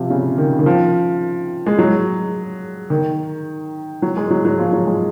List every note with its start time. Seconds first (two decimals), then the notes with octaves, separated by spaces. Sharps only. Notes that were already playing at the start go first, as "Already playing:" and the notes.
Already playing: C3 F3
0.10 C#3
0.38 D#3
0.59 D#3
0.66 F3
1.66 G#3
1.78 F#3
2.90 D#3
4.02 F#3
4.17 G#3
4.30 F#3
4.45 F#3
4.59 F3
4.73 F#3
4.86 G#3